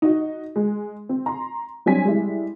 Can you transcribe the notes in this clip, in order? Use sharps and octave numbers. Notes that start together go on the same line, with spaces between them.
D#4 F#4 D#5
G#3
C4
A#5 C6
F#3 G3 C4 D4 G#5 B6
G3 G#3 E4